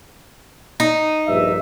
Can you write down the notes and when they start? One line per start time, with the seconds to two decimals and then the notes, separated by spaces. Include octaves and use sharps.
0.80 D#4
1.27 A#1 G2 E5